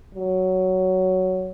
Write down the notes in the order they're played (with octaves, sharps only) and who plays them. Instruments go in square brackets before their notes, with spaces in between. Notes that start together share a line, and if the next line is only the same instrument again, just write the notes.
[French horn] F#3